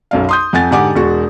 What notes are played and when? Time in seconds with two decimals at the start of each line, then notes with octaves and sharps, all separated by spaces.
0.11 B1 F#2 F5
0.29 C6 D#6 G6
0.53 F2 F#5 G#5 A6
0.71 G#2 D3 G4 F#5 G#5 D6
0.96 E1 G#3 F#4 C#6